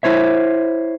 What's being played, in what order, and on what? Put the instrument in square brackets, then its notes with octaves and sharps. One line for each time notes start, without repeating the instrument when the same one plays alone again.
[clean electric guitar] E4 C5 C#5 E5